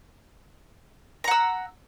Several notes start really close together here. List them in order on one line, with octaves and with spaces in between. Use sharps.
A#5 F#5 E6